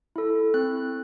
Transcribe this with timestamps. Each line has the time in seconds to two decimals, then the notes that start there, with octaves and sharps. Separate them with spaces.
0.16 E4 A4
0.54 C4 F#6